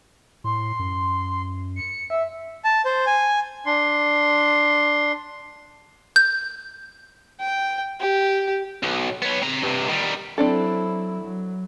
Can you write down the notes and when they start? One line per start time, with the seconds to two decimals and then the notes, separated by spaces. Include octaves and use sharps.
0.44 A2 C6
0.79 F#2
1.76 C#7
2.10 E5
2.65 A5
2.85 C5
3.07 G#5
3.66 D4 C6
6.16 G6
7.40 G5
8.00 G4
8.83 B1
9.22 B3 C#5
9.42 C4 A#5
9.63 G2 C3
9.89 D#3 G3
10.38 F#3 C4 D4 E4 A4
11.21 F#3